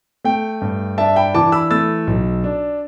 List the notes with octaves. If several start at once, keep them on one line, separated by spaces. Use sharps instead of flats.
A3 G5
G2
D4 E5 A5
G5 B5
E3 A5 D6
B5 E6
A3 E6 A6
B1
D4